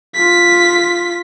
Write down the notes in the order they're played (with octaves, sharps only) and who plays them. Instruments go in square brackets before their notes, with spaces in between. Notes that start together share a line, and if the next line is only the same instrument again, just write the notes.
[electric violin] F4 B6